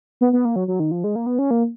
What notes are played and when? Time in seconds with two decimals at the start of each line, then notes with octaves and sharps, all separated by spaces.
0.21 B3
0.33 B3
0.45 A#3
0.56 F#3
0.68 F#3
0.80 D#3
0.91 F3
1.04 G#3
1.16 A#3
1.26 B3
1.39 C#4
1.51 A#3